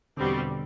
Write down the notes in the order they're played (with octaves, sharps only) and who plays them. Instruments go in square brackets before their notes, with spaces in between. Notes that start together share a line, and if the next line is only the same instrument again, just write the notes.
[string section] E2 B2 G3 C4 [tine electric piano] D3